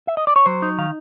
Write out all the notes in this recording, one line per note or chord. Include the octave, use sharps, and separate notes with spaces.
E5
D#5
D5
C#5
F#3 C5
D#4
D#3 F5